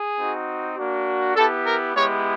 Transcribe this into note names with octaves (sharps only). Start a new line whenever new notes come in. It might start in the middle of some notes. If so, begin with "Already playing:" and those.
Already playing: G#4
C4 D#4 F#4
A#3 D4 F#4
B3 E4 G4 A4
A#4
G#3 B3 E4 G4 C#5